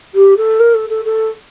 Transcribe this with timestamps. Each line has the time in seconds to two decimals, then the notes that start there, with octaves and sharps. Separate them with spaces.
0.14 G4
0.37 A4
0.60 A#4
0.74 A4
0.90 A4
1.05 A4